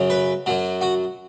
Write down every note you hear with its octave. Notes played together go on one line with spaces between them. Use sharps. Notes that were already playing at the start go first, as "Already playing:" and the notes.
Already playing: F#2 C#3 F#3
B4
F#2 F#3
F#4